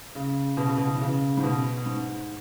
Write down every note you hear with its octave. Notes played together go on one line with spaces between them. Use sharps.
C#3
B2
C#3
B2
E3
C#3
G#2
B2
G#2